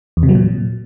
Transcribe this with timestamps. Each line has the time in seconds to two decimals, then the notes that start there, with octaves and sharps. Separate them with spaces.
0.17 E2
0.23 C3
0.29 F#3
0.35 A#2